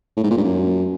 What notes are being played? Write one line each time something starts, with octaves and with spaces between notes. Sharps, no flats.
A2
G#2
A#2
G2
F#2